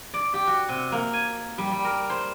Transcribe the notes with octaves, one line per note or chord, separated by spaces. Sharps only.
D5
G4
F#4
C3
A#3
G#5
G3
G3
A#4
C5